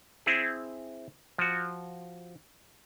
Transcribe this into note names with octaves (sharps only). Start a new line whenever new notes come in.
C4 E4 G#4
F3 F#4